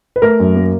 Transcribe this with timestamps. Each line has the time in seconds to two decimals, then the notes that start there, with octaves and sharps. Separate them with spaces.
0.16 B4
0.22 A3 A#4
0.40 F#2
0.55 A#3